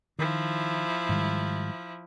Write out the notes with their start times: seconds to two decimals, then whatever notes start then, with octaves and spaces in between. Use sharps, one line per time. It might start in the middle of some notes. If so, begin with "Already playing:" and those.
0.19 D#3 F3 E4
1.09 G#2 D#3 G3